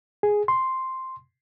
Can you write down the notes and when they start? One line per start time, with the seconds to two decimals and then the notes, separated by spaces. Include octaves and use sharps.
0.23 G#4
0.48 C6